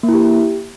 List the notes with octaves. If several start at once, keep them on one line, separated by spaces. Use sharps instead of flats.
A#3
E4
G4